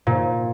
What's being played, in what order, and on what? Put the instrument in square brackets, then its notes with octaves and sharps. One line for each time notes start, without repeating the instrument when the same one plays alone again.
[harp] A#2